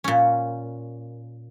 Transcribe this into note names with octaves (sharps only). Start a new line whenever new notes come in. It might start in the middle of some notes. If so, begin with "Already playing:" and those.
A#2 C#4